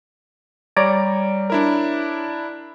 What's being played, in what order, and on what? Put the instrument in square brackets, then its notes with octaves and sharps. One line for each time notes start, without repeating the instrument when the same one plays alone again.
[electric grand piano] G3 D7 [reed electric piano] C#5 D5 A#5
[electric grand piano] D4 E4 A#4